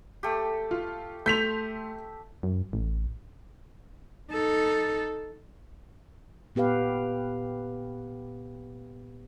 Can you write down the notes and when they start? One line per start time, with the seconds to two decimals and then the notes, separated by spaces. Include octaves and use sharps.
0.23 A3 G4
0.71 F4
1.26 A3 E5 C6 G6 B6 F7
2.43 F#2
2.73 A1
4.31 D#4 A4
6.55 A#2 B3 G4 B4 F5